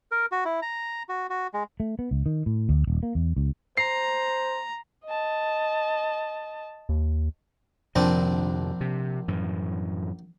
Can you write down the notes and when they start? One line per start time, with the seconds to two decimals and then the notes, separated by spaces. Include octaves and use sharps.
0.12 A#4
0.32 F#4
0.45 E4
0.62 A#5
1.09 F#4
1.30 F#4
1.54 G#3
1.80 A3
1.99 B3
2.11 C#2
2.26 D#3
2.46 A2
2.69 D2
2.87 D#1
3.03 A#3
3.15 E2
3.37 C#2
3.77 C5 A#5 C7
5.04 D#5 A5
6.89 D#2
7.96 A#1 F2 C3 D#3 C4 D4
8.81 C3
9.28 F#2 A2 E3